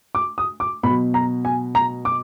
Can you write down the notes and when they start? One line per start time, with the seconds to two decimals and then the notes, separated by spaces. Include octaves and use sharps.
0.15 D6
0.38 D#6
0.60 D6
0.83 B2 F#3 B5
1.14 A#5
1.45 G#5
1.75 A#5
2.05 D6